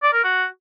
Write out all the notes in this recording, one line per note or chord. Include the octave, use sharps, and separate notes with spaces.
D5
A#4
F#4